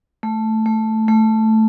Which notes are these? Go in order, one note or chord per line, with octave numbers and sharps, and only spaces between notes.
A3
A3
A3